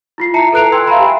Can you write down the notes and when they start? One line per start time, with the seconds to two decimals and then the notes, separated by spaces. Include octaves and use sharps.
0.18 E4 F4 C7
0.34 E5 A5 A#5 C7 C#7
0.52 A4 B4 A#5 F#6 D7 F7
0.72 G5 G#5 C6 E6 G#6
0.87 E5 F5 A#5 B5
0.99 G4